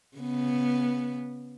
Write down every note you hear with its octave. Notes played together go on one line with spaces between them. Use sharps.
C#3 B3